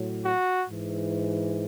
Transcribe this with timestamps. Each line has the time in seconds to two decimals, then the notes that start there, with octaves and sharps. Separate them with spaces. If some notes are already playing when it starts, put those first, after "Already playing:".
Already playing: A2 F#3
0.25 F#4
0.69 G#2 E3